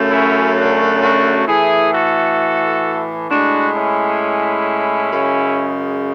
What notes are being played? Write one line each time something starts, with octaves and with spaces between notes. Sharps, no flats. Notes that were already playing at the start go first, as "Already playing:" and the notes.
Already playing: F#2 C#3 F#3 A3
C#4 E4
D4 F#4
D4 F#4
A2 E3 A3 E4 G#4
F#4 A4
A2 G#3 D4 F#4
C#4 E4
F#2 C#3 G#3